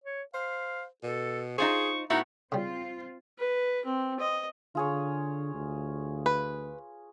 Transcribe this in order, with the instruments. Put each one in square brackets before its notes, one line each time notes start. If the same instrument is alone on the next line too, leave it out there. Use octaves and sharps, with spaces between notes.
[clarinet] C#5
[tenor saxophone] C5 [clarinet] F5
[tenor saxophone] B2 [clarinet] A4
[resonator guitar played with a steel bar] D#4 F4 C5 [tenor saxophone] G#4 [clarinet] C#6
[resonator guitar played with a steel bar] A2 B3 F#4 [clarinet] D#4 [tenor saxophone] E4
[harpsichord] C#3 G3 [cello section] C4 F4
[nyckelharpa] B4
C4
D#5
[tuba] D3 [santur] F4 G#4 C#5
[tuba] D2
[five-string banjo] B4